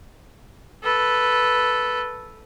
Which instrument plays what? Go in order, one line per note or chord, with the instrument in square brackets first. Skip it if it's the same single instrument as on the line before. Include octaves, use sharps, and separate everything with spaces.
[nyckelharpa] A4 B4